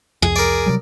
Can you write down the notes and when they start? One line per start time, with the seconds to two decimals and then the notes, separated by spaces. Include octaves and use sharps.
0.22 C2 F2 G#4
0.36 A#4 D5
0.66 C3 F#3 G3